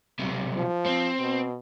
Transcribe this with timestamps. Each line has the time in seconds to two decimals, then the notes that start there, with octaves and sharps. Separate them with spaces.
0.19 B1 C3
0.56 F3
0.86 C4
1.20 B2